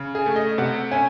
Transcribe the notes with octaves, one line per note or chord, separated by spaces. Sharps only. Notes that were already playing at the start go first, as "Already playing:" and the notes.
Already playing: C#3
G#4
A3
D#5
C3 F#5
C#4 G#5